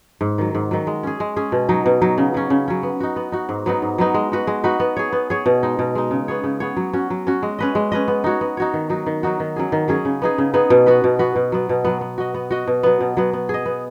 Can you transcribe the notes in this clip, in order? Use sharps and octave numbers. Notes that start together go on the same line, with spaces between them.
G#2
D#3 F#3
G#2
D#3 F#3
G#3
C#4 G#4
G#3
C#4 G#4
B2
F#3 D#4
B2
F#3 D#4
C#3
F#3 C#4
C#3
F#3 C#4
B3
D#4 F#4
B3
D#4 F#4
G#2
F#3 B3 D#4
G#2
F#3 B3 D#4
G#3
D#4 F#4 B4
G#3
D#4 F#4 B4
B3
G#4 C#5
B3
G#4 C#5
B2
G#3 D#4
B2
G#3 D#4
C#3
B3 G#4 C#5
C#3
B3 G#4 C#5
F#3
C#4 F#4
F#3
C#4 F#4
G#3
C#4 B4 D#5
G#3
C#4 B4 D#5
B3
D#4 F#4 C#5
B3
D#4 F#4 C#5
D#3
F#3 D#4 F#4
D#3
F#3 D#4 F#4
D#3
F#3 C#4 G#4
D#3
F#3 C#4 G#4
C#3
B3 D#4 G#4
C#3
B3 D#4 G#4
B2
B3 F#4 B4
B2
B3 F#4 B4
B2
F#3 B3
B2
F#3 B3
B3
F#4 D#5
B3
F#4 D#5
B2
F#3 B3
B2
F#3 B3
B3
G#4 D#5
B3